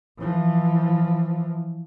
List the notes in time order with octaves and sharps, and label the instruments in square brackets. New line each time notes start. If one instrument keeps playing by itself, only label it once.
[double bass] E3 F3